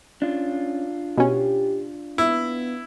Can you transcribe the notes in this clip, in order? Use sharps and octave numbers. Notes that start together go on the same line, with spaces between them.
C#4 D4 F4
B2 C#4 G4
B3 E4